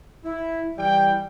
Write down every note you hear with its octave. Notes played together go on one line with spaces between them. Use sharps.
E4
E3 G3 G5